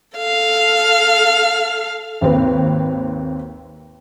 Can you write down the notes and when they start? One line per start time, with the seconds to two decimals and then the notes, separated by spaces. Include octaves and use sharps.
0.18 A4 F5
2.21 G#1 D#2 C4 B4